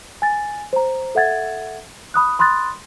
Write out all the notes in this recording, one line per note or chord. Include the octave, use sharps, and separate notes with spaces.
G#5 A6
C5 A#5
A4 E5 F#5 G#6 A6
B5 D#6 F#6
B5 C6 D#6 F#6 A6